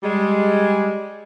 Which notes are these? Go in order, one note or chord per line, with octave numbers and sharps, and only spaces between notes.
G3 G#3